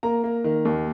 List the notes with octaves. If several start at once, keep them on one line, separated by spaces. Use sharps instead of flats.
A#3 A#5
A#3
D#3
D#2